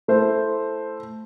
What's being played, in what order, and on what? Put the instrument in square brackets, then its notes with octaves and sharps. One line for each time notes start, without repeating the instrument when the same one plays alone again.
[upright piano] A3 E4 C5